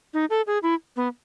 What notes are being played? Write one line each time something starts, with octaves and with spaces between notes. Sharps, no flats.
D#4
A4
G#4
E4
B3